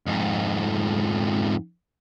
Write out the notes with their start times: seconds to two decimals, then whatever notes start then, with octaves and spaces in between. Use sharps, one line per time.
0.07 F2 G#2